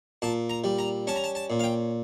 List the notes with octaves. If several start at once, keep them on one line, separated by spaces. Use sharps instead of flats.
A#2 A5
A#5
G3
A#5
C#4 A5
A#5
A5
A5
A#2
F5
G5